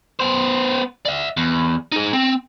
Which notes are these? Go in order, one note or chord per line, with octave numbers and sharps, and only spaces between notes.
B3 C5
D5 E5
E2
D#4 G#4
C4